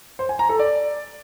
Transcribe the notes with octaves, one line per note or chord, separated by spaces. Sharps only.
C5
G#5
A#5
A4
D5